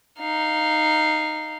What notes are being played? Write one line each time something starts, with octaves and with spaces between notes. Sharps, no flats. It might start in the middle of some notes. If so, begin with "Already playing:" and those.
D#4 F5